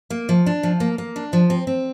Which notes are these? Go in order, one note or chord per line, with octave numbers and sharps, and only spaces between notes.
A#3
F3
D4
F3
A#3
A#3
D4
F3
C4
C4